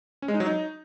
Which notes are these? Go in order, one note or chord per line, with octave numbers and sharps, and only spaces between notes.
C#4
G#3
D#4
F#3
D#4